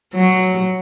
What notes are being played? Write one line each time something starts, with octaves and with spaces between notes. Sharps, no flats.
F#3